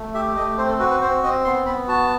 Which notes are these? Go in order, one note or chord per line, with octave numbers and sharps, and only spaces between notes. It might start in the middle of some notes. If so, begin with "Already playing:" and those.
Already playing: A3
G4 E5
A3 D#5
C4 C5
A4
F#4 B4
B4
C4 C5
C4 D#5
B3 C6
B3 B5
F#4 A5